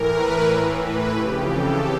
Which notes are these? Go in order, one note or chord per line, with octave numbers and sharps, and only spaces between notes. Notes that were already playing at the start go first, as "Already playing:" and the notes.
Already playing: A2 E3 A#4
B4
A2 E3
B4
F2 C#3 E3 G4
A4